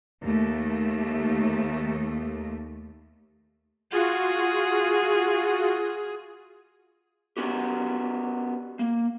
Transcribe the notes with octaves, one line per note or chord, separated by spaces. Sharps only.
D#2 A3
F4 F#4 G#4
B3 C#4 F#4 G4
A#3